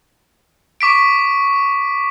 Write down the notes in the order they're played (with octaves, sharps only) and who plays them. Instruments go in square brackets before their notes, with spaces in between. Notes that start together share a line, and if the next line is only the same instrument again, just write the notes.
[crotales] C#6 D6 B6 D7